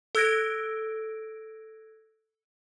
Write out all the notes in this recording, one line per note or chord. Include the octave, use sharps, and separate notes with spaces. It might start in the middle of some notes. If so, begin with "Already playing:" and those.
A4 E6 F#6 G#6 A#6 D7